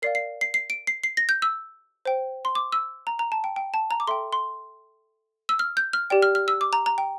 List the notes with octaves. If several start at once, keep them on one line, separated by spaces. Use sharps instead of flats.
A#4 D5 F5 C7
C7
C7
C7
D7
C7
C7
A#6
G6
E6
C5 G5
C6
D6
E6
A#5
A#5
A5
G5
G5
A5
A#5
D6
A4 E5 G5 C6
C6
E6
F6
G6
F6
G4 D5 G5
F6
F6
E6
D6
A#5
A#5
G5